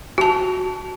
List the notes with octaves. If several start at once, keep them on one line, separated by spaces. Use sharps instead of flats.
F#4 A5